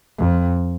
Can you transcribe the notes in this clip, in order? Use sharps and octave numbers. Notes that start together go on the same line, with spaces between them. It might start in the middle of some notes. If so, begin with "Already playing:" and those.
F2